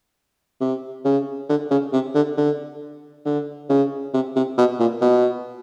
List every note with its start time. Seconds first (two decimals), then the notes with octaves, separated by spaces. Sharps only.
0.61 C3
1.05 C#3
1.49 D3
1.71 C#3
1.93 C3
2.15 D3
2.37 D3
3.26 D3
3.69 C#3
4.14 C3
4.36 C3
4.58 B2
4.80 A#2
5.01 B2